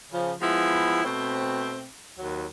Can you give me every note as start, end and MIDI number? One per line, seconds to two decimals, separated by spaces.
0.12 0.33 49
0.12 0.33 53
0.41 1.01 53
0.41 1.01 56
0.41 1.01 59
0.41 1.01 64
1.04 1.87 47
1.04 1.87 57
1.04 1.87 60
2.18 2.46 39
2.18 2.46 54